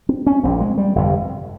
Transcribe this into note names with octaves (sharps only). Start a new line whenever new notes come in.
C4
C#4
A#1 A#2 C4
G#3
G3
G1 F2 C3